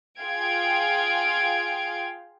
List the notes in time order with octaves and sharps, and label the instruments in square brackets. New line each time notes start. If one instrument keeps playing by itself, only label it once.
[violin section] F4 G#4 F5 G5 G#6 D7